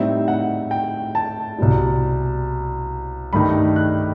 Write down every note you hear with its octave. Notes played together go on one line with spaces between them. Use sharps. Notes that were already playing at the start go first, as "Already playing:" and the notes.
Already playing: A2 G3 C4 D#4 E5
F#5
G5
A5
C2 B2 G3
G2 D#3 A3 D#4 B5
F#6